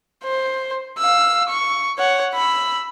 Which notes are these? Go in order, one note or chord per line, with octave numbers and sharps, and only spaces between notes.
C5
F5 E6
C#6
C#5 F#5
B5 E6